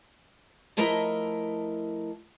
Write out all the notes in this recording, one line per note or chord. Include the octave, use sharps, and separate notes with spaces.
F3 A3 E4 A#4 D#5 A#5